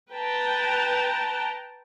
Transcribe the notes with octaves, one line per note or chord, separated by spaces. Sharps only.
B4 G5 A5 A#5